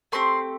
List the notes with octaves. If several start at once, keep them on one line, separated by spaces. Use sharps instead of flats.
A3 C4 G4 C6